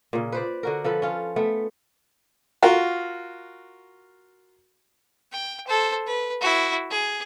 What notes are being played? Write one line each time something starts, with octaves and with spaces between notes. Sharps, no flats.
A#2 C#3
B4 C5 D5
D3 F#4 A#4
F3 A4 B4
C#4 F4 A4
A3 B3
F4 F#4 A#4
G5
A4 C5
B4
E4 F#4
G#4